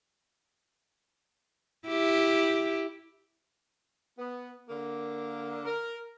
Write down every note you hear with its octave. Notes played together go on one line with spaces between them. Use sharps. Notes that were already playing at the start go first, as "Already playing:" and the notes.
E4 G4
B3
D3 A#3
A#4